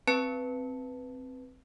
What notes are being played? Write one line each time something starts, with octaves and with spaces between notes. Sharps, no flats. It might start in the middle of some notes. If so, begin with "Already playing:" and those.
C4 B4 A5 C#7